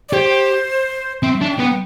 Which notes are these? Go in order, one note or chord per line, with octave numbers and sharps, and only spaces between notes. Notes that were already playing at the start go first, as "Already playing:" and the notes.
D5
G4 C5
C4 E5
D4
G5
B3